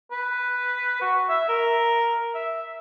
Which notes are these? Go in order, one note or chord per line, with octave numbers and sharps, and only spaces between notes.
B4
F#4
E5
A#4
E5